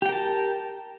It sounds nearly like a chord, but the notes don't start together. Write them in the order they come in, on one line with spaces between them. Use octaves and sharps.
G4 G5 A#4 A5